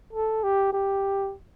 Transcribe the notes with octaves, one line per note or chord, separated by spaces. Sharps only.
A4
G4
G4